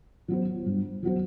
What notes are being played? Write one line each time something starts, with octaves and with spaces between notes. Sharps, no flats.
F#3 B3 F#4 C5
G2
F#3 B3 F#4 C5